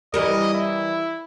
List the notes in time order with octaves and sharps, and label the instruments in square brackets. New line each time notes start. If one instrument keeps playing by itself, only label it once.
[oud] E3 G3 A#4 [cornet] D#5
[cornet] E4